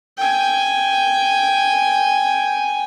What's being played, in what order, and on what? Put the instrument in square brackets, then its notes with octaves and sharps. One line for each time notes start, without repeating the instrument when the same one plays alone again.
[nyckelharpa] G5 G#5